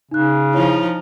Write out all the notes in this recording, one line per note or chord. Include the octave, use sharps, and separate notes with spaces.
C#3 D#4 F#6
F3 D#4 E4 C#5